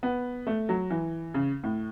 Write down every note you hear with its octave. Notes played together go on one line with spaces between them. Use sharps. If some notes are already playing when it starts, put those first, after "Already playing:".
B3
A3
F#3
E3
C#3
A2